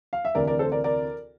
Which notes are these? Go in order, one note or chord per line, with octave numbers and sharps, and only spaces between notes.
F5
E5
D2 C3 E3 A#4 D5
A#4 D5
A4 C5
A#4 D5
A#4 D5